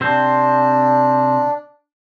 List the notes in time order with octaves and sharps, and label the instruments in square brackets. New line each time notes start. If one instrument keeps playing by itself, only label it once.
[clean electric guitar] C3 C4 C5 [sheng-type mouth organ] D4